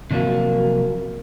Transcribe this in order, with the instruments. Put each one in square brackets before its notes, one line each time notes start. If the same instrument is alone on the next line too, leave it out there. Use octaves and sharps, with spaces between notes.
[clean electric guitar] C3 F3 F#3 A#3